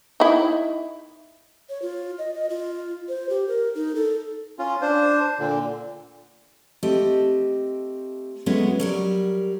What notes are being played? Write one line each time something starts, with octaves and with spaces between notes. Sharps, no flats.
D#4 E4
C#5
F4
D#5
D#5
F4
C5
G4
A#4
D#4
A4
C#4 F4
D4 C5
A#2 D3
A3 C4 G4 D#5
F#3 G#3 A3 B3 C#4
F#3 G3 A#4